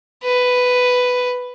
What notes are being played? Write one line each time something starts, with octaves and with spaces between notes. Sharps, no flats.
B4